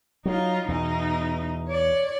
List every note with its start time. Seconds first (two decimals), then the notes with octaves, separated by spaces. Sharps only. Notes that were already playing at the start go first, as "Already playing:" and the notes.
0.25 F#3 D#4 F4
0.68 E2 B2 D#4
1.69 C#5 D5